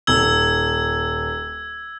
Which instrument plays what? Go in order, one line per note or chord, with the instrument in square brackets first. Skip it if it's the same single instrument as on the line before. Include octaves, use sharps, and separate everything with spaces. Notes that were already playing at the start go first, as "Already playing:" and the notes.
[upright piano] D#1 G7 [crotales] E6 G#6